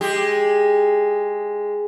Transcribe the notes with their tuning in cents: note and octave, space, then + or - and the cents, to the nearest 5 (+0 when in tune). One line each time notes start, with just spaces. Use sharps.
G#3 +0 G4 +10